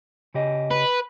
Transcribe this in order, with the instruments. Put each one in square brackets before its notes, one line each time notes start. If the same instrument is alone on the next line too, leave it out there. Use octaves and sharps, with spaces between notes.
[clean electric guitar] C#3 G4 D#5
[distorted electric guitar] B4